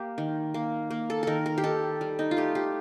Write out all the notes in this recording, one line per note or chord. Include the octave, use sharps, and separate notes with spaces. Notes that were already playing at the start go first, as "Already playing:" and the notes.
Already playing: A#3 G4
D#3
A#3
A#3
A4
D#3 A4 A#4
A#4
G4
D#3 A4
G3
D#4
F4
A3 G4
G4